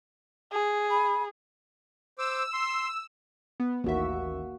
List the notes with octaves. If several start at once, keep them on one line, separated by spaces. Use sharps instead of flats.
G#4
B5
C5 D6 E6
C6
B3
A1 D#2 A#3 F#4 E5